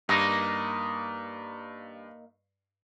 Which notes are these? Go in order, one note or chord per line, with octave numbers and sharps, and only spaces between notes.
G2 A#3 D#4